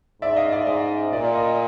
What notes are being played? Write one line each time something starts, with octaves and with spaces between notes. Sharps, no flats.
G#2 D5 E5
D#5 F5
D5 E5
G#2 D#5
A#2 D5
D#5